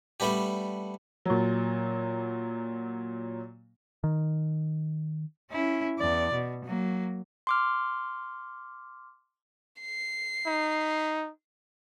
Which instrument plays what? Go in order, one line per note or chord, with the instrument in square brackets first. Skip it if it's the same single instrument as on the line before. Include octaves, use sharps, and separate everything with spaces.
[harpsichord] G3 A3 B3 D4 G4
[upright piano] A#2 F#3
[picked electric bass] D#3
[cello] C#4 E4
E2 D5
B2
F#3 A#3
[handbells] C6 D6 F6
[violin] C7
[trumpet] D#4